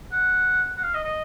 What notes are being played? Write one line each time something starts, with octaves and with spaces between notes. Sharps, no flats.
F#5
F#5
F5
D#5
D#5